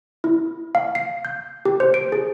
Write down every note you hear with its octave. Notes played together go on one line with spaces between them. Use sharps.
E4
F5
C7
G6
G4
C5
D7
G#4